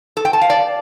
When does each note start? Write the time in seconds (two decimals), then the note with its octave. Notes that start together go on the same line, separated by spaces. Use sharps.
0.17 A4
0.25 G5
0.33 A5
0.41 F5
0.50 D5